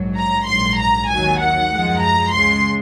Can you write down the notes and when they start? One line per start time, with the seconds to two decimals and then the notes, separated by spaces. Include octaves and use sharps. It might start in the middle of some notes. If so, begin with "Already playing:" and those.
Already playing: A#1 G#2 F#3
0.17 A#5
0.47 A#1 G#2 F#3 C6
0.78 A#5
1.09 D#2 D#3 F#3 G#5
1.40 F#5
1.70 F#2 F3 G#3
2.01 A#5
2.32 C#2 C#3 G#3 C6